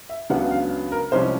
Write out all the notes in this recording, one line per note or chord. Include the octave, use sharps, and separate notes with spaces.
E5
C#2 C#3 F#3 B3 D4 F#5
F5
A#4
C2 C3 F3 G#3 C#4 C5